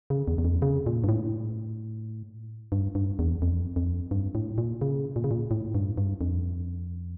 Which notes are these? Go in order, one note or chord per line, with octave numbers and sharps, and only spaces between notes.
C#3
E2
E2
F2
C#3
A#2
G2
A2
G2
G2
E2
F2
F2
G2
A2
A#2
C#3
A#2
C#3
A#2
A2
G2
G2
F2